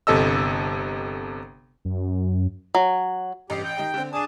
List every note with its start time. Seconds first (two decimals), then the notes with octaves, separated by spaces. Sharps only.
0.07 G1 C3 A4 D#5 E6
1.85 F#2
2.75 F#3
3.50 A1 G2 G4 D#5 C7
3.64 G5
3.77 D#3 D#4 G4
3.94 D3 C4
4.13 D4 G#4 A5 D#6 D#7